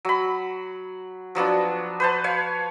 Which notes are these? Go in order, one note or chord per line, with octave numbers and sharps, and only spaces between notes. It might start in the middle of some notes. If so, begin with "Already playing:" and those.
F#3 B5
F3 F#3 B3 D4
B4 C5 A5
C#5 F5